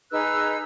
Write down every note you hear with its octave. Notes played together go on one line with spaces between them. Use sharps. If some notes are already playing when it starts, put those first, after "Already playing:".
D#4 G#4 B4 E6 F#6